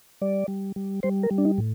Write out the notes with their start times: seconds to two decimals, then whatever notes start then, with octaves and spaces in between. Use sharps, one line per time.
0.22 G3 D5
0.48 G3
0.76 G3
1.03 G3 C5
1.23 A#4
1.31 G3
1.38 D4
1.45 D#4
1.58 A2